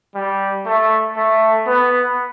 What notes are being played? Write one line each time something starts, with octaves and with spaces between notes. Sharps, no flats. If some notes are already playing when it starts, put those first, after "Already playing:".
G3
A3
A3
B3